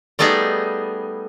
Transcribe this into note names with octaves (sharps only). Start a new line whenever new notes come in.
G3 A3 B3 D#4 G#4